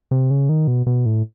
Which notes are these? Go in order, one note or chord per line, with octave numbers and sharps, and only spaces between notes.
C3
C#3
D#3
B2
B2
A2